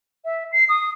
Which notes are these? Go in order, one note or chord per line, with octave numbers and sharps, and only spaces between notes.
E5
C7
D#6